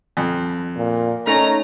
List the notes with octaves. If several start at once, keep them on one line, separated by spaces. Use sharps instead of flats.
F2
A#2
A3 C#4 D#4 A#5